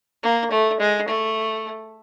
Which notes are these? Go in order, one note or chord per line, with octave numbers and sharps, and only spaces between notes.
A#3
A3
G#3
A3